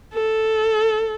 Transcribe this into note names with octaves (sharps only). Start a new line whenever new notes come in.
A4